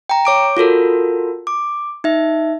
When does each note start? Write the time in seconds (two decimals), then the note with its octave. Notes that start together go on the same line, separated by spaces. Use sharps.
0.09 G5 A#5
0.25 C#5 D6 D7
0.57 F4 F#4 A4 A#4
1.47 D6
2.04 D#4 E5